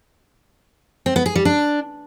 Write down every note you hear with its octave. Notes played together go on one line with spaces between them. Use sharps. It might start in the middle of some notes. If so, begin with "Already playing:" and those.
C4
B3
G#4
G3
D4